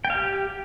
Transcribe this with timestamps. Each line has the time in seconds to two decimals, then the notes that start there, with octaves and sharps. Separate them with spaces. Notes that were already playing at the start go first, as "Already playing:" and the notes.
0.05 G5
0.10 F5
0.15 G4